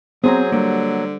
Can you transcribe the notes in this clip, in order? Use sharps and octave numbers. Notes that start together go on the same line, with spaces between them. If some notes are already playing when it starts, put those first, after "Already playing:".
F#3 B3 C4 G#4 C5 A#5
D3 G3 A#3